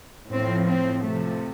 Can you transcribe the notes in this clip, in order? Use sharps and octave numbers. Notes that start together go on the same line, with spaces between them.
A2 F3 C4
C4
C3 F3 A3